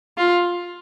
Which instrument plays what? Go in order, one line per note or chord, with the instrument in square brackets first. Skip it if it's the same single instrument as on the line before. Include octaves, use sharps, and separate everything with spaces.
[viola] F4